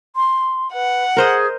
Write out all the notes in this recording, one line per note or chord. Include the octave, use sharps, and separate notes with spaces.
C6
B4 F#5
G#4 A#4 C5 D#5